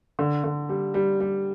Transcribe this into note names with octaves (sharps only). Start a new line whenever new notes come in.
D3
D3
G3
G3
G3